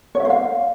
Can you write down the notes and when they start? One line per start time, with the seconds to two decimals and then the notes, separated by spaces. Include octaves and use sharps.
0.15 C#5
0.20 E5
0.25 C5
0.30 F5